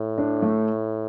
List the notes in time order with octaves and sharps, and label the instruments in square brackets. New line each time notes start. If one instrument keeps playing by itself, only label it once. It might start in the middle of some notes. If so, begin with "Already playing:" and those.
Already playing: [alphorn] A2
[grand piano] D4
A3